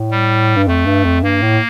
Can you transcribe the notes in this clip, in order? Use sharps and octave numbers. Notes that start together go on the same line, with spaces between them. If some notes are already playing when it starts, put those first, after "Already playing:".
Already playing: A2
G3
G2
F2 A3
G2
F2
G2 A#3
A2